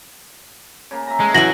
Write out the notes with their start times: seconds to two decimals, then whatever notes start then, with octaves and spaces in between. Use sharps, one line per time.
0.91 C#3 A#3
1.07 E5 A#5
1.20 G#3 A3
1.34 F#2 A2 E3 F#3 G#5 A#6 F#7